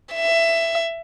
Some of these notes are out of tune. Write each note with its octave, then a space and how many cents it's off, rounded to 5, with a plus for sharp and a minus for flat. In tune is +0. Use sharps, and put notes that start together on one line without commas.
E5 +15